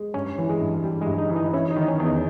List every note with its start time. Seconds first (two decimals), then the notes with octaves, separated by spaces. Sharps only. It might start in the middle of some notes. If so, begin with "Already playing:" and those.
Already playing: G#3
0.14 G2 C#4
0.38 E3
0.49 G#3
0.61 G2
0.84 G3
1.01 G#3
1.06 G2
1.18 D#4
1.30 E3
1.36 D#4
1.53 C#4 E4
1.71 D#4
1.76 D#3
1.82 D#4
1.88 C#4
2.00 E2
2.05 D#4